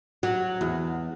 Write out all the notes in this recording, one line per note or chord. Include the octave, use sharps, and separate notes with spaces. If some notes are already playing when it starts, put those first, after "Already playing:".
F#3
E2